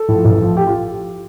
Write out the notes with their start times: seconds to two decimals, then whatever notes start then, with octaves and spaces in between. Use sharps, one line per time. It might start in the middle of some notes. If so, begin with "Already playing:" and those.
Already playing: A4
0.08 A2 F3
0.25 A1
0.41 A2 F3
0.57 G4
0.67 F4